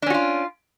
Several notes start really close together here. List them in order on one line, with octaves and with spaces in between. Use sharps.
D4 C#4 F#4 F4